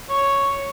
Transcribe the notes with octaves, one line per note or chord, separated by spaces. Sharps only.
C#5